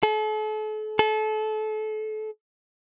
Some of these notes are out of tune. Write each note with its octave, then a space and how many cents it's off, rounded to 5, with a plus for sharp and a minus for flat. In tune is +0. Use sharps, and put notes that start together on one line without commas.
A4 -40
A4 -30